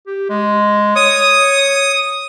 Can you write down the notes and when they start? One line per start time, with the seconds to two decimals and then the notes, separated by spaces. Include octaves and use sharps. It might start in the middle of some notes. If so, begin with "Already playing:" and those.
0.07 G4
0.30 G#3
0.96 C#5 D#6